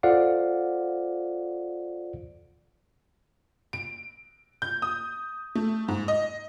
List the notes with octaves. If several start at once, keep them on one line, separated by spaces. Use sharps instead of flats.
F4 A4 C5 D5 F5 F#5
D7
G6
D#6
A3
G#2
D#5